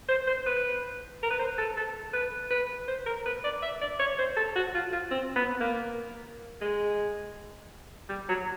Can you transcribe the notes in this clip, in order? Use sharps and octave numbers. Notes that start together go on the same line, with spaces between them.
C5
C5
B4
A#4
B4
C5
A4
A4
B4
B4
C5
A#4
B4
D5
E5
D5
C#5
C5
A4
F#4
F4
F4
C4
B3
A#3
G#3
G3
F#3